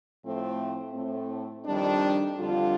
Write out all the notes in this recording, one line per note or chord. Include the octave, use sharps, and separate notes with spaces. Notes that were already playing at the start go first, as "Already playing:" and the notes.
A2 F3 A3 C4
A2 A3 C4
F2 D#3 G3 D4
F2 D3 G3 D4 F4